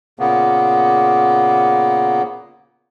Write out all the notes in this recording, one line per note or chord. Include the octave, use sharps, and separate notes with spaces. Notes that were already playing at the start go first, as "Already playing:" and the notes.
A#2 C#3 A#3 B3